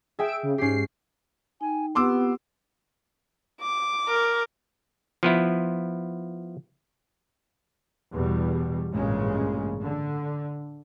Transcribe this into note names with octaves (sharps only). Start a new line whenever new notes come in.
G#4 E5 G5 E6 D7
C#3
G#2 C#4 G4 C7
D#4 G5 G#5
B3 C4 F4 G4 C6 D6 E6
D6
A#4
F3 B3 E4
E2 B2 G3
A1 G2 A#2 C#3 G#3
D3